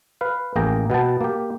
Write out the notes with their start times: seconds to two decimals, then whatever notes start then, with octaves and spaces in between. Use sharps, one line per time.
0.21 B4 F5
0.56 A1 A#3 G#4 G5 A#5
0.90 B2 B3 G5 A5
1.21 A#3 G4